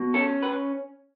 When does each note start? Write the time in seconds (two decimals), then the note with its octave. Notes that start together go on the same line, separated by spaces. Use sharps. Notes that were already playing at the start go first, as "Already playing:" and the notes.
Already playing: B2
0.14 C#4 A4
0.42 B4